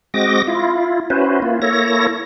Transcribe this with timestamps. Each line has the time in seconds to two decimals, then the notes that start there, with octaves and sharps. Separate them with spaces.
0.14 G#3 C4 F#4 D#5 D6 A#6
0.48 E4 F4
1.10 C#4 E4 F#4 B4 C5
1.42 A#3 E4 F4
1.62 A#3 E4 A4 C#5 A#6